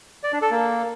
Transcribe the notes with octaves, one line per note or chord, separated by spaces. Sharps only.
D5
D4
A4
A#3